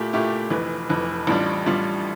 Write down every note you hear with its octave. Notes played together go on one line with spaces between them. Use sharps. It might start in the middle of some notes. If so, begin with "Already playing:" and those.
Already playing: A#2 A3 E4 G4
A#2 A3 E4 G4
F1 F2 E3
F1 F2 E3
A1 A2 G3 D4 F4
A1 A2 G3 D4 F4